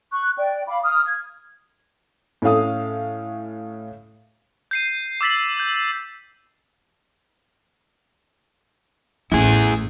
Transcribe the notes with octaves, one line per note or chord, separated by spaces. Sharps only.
C#6 F#6
D5 G5
F5 B5 D6
D#6 F6
G#6
A2 C#4 A4 F5 D#6
G6 C7 D#7
D6 E6 A6 B6 F#7
G6
A1 A2 E4 G#4